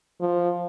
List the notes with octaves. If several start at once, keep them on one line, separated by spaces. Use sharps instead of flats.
F3